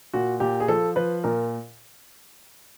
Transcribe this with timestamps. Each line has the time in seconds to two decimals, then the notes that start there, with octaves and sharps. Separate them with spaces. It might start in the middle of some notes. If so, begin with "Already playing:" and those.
0.13 A#2 F#4
0.40 A#2 G4
0.60 G#4
0.68 F3 A4
0.96 F3 B4
1.24 A#2 A#4